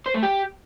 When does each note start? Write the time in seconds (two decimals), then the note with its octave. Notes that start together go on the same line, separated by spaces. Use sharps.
0.06 C5
0.15 A3
0.23 G4